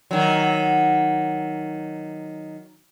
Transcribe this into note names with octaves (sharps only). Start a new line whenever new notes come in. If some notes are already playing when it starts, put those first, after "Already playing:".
D#3 F#3